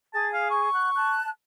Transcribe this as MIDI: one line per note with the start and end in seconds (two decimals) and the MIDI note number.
0.14 0.69 68
0.14 0.28 81
0.34 0.46 77
0.50 1.14 85
0.74 0.89 78
0.74 0.89 90
0.95 1.29 81
0.95 1.29 90